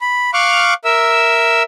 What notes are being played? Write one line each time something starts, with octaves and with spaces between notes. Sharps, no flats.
B5
F5 C#6 D6 F6 F#6
A#4 E5 E6